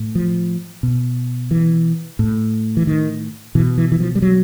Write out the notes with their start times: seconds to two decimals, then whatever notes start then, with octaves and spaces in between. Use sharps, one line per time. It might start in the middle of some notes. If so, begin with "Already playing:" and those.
Already playing: A2
0.15 F3
0.83 B2
1.51 E3
2.19 A2
2.77 E3
2.87 D#3
3.55 B2 E3
3.78 E3
3.92 E3
4.00 F3
4.15 G3
4.22 F#3